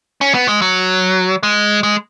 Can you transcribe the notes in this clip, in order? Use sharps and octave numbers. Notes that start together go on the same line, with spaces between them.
C#4
B3
G#3
F#3
G#3
G#3